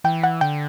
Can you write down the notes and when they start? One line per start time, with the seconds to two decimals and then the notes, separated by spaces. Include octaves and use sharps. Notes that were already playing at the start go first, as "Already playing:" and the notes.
0.04 E3 G5
0.23 F#5
0.41 D3 G5